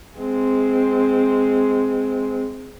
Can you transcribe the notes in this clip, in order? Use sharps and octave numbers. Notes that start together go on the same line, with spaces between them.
G#3 C4